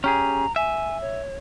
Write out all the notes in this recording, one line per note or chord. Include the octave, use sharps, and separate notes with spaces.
C#4 G4 G#4 A#5
E5 G#5
C#5